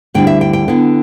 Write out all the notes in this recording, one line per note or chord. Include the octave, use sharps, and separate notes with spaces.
D2 D3 G3 E4 G5
E5
G5
G5
D3 B3 E4